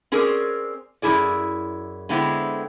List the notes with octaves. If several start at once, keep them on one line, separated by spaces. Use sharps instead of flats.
C4 C#4 G#4 A#4 D5
F#2 D#3 E4 G#4 D5
D3 G#3 B3 C4 E4